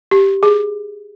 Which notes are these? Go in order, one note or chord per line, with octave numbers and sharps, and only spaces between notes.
G4
G#4